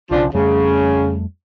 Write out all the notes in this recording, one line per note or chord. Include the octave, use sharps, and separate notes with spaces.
B1 C#3 F3 D4
F2 C#3 G3 A3